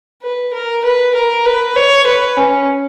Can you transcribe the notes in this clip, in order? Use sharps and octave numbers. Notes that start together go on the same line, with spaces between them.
B4
A#4
B4
A#4
B4
C#5
B4
C#4